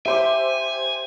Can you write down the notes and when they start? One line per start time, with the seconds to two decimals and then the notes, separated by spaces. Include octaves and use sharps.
0.06 G4 C5 E5 G#5 D6